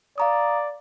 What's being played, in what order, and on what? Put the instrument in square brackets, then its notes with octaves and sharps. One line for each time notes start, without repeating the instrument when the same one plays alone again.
[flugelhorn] D5 [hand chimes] F5 A#5 D#6